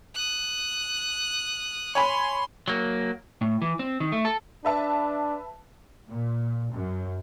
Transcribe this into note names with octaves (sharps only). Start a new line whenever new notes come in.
D#6 F#6
C#5 G#5 B5 C6
F#3 A#3
A2
E3
C4
D#3
A3
A4
D4 B4 E5 A5
A#2
F#2